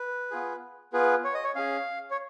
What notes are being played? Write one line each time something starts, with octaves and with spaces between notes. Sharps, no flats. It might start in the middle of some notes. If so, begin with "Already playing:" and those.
Already playing: B4
B3 F4 G#4
B3 F4 G#4 B4
C#5
D#5
C#5
C#4 G#4 F5
C#5